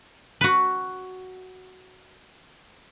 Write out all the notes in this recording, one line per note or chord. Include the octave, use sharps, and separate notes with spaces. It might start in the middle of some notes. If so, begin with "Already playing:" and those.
F#4 B4